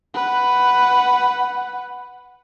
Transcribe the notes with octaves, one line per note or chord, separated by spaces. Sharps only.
B4 F#5